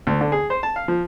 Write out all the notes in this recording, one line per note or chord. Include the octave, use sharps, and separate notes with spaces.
D2
D3
G#4
C5
A5
F5
F3